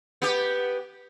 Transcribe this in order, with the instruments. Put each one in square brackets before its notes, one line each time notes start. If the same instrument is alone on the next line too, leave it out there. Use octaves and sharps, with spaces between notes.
[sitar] B3 G4